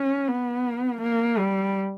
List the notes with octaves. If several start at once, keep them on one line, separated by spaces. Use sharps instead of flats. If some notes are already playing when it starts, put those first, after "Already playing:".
Already playing: C#4
B3
A#3
G3